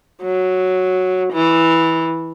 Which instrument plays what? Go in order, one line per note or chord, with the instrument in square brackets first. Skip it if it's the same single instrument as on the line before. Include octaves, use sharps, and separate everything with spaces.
[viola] F#3
E3